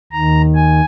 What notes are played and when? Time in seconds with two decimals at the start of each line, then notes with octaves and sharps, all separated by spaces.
0.12 D#2 D#3 A#5
0.55 G#5